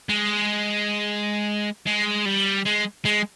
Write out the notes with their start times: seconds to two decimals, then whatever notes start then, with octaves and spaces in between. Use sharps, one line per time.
0.09 G#3
1.87 G#3
2.25 G3
2.65 G#3
3.05 G#3